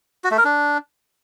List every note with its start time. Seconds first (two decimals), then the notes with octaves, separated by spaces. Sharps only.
0.24 F#4
0.31 A3
0.38 A#4
0.45 D4